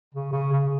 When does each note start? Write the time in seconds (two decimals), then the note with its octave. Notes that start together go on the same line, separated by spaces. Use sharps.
0.14 C#3
0.33 C#3
0.52 C#3